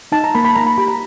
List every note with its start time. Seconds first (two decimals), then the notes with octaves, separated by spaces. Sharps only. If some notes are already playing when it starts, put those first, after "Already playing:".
0.12 D#4 A5
0.24 A#5
0.35 A#3 B5
0.45 B5
0.55 A#3 A#5
0.67 B5
0.78 G4 B5
0.88 A#5